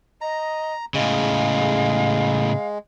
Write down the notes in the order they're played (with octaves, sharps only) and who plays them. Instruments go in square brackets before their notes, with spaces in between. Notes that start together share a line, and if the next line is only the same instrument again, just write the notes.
[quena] D#5 [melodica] A#5
[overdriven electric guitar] A2 C#3 [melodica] G#3 [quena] F5